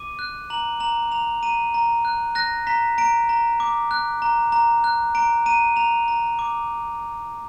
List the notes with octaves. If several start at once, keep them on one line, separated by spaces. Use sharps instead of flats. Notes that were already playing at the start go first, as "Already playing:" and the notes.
Already playing: D6 D#7
F#6
A#5 F#7
A#5 F#7
A#5 F7
A#5 D#7
A#5
F#6
F#6 A#6
A#5 B6
A#5 D7
A#5
D6
F#6
A#5
A#5
F#6
A#5 D7
A#5 D#7
A#5 F7
A#5
D6